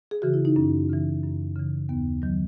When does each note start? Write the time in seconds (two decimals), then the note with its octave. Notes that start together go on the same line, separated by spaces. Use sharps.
0.11 G#4
0.22 C#3 E3 F#4
0.34 E4
0.45 D#4
0.56 F#2 C#4
0.89 C#3 E3
1.23 F#2
1.56 C#3 E3
1.89 D#2 B3
2.22 D#3 F#3